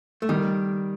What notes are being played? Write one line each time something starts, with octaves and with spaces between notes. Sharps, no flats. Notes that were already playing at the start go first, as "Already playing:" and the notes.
A3
D#3 G3